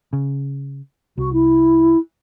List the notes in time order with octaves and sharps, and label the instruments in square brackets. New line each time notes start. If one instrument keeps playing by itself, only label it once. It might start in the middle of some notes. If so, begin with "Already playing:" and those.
[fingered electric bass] C#3
[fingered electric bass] C2 [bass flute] F#4
[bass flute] E4